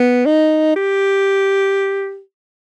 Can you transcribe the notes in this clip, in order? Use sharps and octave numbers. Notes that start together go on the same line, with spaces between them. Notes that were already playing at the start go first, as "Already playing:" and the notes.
Already playing: B3
D#4
G4